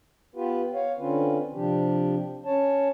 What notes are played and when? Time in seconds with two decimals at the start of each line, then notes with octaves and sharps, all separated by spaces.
0.36 B3 F4 G4 B4
0.74 C#5 F5
0.99 D3 C4 C#4 F4 B4
1.54 C3 F3 D4 G4
2.46 C#4 C#5 A5